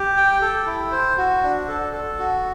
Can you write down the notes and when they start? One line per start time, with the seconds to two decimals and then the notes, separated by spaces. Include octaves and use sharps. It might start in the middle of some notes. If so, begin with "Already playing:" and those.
Already playing: G4
0.17 G5
0.41 A4
0.66 E4
0.92 C5
1.17 F#4
1.43 D4
1.68 A4
1.93 A4
2.19 F#4